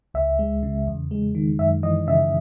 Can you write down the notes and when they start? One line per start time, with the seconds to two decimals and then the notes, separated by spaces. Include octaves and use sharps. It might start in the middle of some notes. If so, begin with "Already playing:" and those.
0.14 C#2 E5
0.39 G#3
0.63 C#3
0.87 E2
1.11 G#3
1.35 D#3
1.59 F#2 E5
1.83 E3 D#5
2.07 C#3 E5